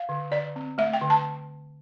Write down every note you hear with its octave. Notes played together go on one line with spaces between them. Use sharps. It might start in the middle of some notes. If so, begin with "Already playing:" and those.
Already playing: F5
D3
D3 D5
C4
A3 E5
G5
D3
A5